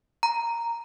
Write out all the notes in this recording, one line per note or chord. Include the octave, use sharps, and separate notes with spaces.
A#5